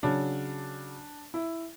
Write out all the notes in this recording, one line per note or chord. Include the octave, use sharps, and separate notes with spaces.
C#3 F#3 D4
E4